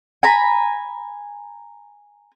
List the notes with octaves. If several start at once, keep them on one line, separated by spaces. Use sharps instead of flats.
G#5 A#5 B5